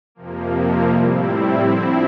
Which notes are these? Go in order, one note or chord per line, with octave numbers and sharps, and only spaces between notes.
F2 C3 F3 A#3
A2 G3 C4 E4
D3 F3 C4 E4